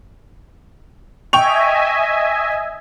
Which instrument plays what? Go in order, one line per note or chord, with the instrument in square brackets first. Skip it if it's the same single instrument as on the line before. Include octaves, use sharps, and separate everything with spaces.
[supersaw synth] D#5 E5 G#5 [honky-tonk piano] G5 C#6 F7